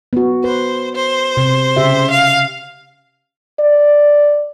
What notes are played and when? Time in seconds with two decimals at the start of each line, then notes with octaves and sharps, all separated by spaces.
0.13 B3 F#4
0.44 B4 C5
0.95 C5
1.37 C3
1.77 C#3 G4 E5
2.11 F5
3.60 D5